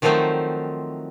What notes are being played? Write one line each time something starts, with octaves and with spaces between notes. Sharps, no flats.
D#3 F3 F#3 A3 C4 D#4